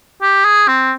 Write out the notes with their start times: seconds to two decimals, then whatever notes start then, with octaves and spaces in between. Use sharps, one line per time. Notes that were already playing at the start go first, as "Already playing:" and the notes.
0.22 G4
0.45 G#4
0.68 C4